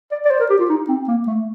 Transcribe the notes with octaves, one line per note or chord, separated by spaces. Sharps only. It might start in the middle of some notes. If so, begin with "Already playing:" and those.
D5
D5
C5
A#4
G4
F4
D#4
C4
A#3
A3